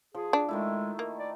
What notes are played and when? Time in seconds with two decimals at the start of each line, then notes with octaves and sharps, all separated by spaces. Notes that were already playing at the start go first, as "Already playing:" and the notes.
0.15 F3 G#4
0.33 D4
0.49 D#3 G#3 A3 E4
0.99 A#3
1.19 D5